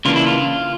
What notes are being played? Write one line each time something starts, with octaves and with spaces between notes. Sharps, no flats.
C#3 E3 A#3 D4 F4
E4
F4